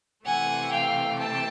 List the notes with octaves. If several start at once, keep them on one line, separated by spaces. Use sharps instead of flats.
C3 E3 A3 F#5 G#5
F5 G5
G5 A5